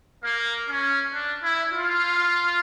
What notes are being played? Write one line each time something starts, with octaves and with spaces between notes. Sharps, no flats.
A#3
C#4
D4
E4
F4